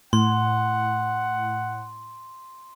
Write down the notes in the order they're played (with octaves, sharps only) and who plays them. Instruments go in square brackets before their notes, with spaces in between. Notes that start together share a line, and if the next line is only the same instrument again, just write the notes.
[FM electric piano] A2 [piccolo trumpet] F#5 [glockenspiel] C6